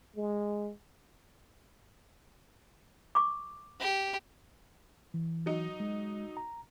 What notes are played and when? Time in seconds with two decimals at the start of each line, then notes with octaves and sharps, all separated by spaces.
0.16 G#3
3.15 C#6 D6
3.80 G4
5.14 E3
5.46 F#3 D#4
5.80 G#3
6.37 A#5